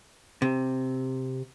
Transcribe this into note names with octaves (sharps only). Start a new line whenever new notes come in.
C3